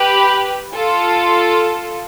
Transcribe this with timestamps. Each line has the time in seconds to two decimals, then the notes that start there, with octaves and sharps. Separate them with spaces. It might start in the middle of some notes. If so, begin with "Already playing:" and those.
Already playing: G4 B4
0.75 F4 A4